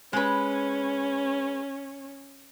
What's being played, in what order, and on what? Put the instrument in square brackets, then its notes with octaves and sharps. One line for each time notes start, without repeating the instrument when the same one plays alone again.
[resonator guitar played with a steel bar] G#3 B4 [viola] C#4